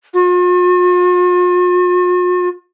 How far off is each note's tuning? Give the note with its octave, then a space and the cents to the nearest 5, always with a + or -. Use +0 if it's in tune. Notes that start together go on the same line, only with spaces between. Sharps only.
F4 +45